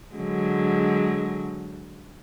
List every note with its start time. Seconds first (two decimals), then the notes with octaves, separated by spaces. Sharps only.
0.15 D3 F#3 G#3